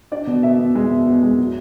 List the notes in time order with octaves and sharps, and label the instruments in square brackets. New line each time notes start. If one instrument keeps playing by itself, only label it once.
[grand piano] D4 D5
B2
B2 E5
B2
G#3
B2
B2
G#3
F#3